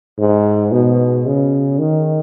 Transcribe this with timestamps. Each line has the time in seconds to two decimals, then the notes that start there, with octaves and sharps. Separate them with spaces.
0.19 G#2
0.72 B2
1.26 C#3
1.79 D#3